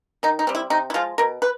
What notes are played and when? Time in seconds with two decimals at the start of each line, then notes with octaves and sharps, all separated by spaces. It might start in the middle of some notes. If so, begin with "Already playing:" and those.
0.23 D#3 D#4
0.39 D#4
0.47 G3 C4
0.55 E4
0.70 C3 D#4
0.90 E4
0.94 F3 G#3 F4
1.18 B2 A#4
1.42 B4